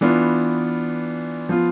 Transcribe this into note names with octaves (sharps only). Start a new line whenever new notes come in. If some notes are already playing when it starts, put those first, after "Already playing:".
E3 B3 D4 F4
F3 B3 F4